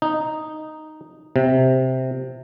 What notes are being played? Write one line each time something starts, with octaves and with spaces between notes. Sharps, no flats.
D#4
C3